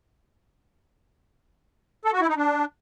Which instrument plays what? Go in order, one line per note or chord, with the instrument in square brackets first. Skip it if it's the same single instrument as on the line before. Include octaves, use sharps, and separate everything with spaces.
[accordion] A4
F#4
E4
D#4
D4